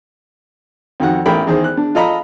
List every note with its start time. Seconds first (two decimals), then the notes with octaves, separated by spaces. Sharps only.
1.00 F2 D#3 F#4 F#5
1.26 A1 A#4 G5 B5
1.47 E2 D#3 G#4 C5
1.64 F#6
1.77 D4
1.95 F4 A4 D#5 A#5 B5